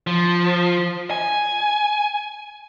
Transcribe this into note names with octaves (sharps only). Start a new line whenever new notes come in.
F3
G#5